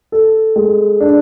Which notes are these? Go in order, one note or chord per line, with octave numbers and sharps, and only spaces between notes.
A4
G#3
D4